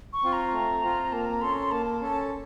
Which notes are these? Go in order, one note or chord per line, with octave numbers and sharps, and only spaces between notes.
C#6
C4 F4
A#5
A3
C4 F4
A#3 A5
A#5
C#4 A4 C6
C6
A#3 A5
A5
C#4 A4 A5